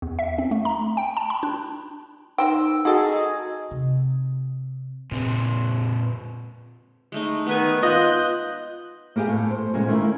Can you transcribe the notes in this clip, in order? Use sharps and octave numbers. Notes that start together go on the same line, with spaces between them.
E2
E5
C4
A3
A#5
G5
A5
B5
D4
D#3 D#4 C5 G5 E6
G#3 D#4 F#4 G#4 A4 D#5 F#5
C3
A#2 C#3 C4
G#3 A3 D#4
D#3 B3 B4 G#5
F4 D#5 F#6 G6
A#3 B3 G4 G#4 F5
A2
C5
A#2 C#3 G#3 B3
D#3 A3 A#3 C#4 E4 A#4